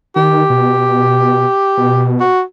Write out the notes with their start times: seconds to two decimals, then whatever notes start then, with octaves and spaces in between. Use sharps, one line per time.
0.16 D#3 G4
0.50 B2
1.77 B2
2.20 F#4